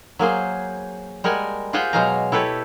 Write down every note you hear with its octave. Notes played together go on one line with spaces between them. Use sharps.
F#3 A#3 G#4 C5
G3 G#3 A#4 F#5 G#5
F4 G4 G#4 C5 F#5 G5
B2 F#3 G#3 F5 G#5 A#5
E4 G4 A4 B4 C#5